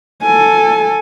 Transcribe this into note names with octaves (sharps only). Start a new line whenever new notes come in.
A4 G#5